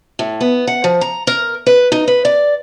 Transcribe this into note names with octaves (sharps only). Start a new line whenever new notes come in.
A2
B3
F#5
F3
A#5
A#4
B4
D#4
B4
D5